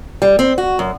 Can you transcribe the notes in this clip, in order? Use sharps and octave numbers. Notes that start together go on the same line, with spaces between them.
G3
C4
F#4
F#2